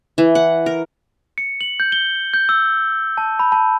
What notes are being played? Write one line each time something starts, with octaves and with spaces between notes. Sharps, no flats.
E3
F#5
A#4
C#7
F#7
G6
G7
G6
E6
A5
B5
A5